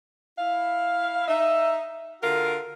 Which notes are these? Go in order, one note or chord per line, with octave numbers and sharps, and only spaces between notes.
E4 F5
D#4 E5
D3 F4 F#4 A#4